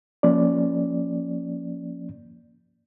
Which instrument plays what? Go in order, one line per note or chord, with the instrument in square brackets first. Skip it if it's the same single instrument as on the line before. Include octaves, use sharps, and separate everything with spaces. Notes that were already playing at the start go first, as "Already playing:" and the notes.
[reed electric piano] F3 A#3 C#4 D5